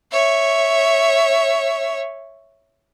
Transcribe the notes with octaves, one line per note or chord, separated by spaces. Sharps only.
C#5 E5